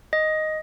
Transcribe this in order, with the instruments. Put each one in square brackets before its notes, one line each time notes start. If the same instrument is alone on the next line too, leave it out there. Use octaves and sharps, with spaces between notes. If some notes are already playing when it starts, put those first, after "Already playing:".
[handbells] D#5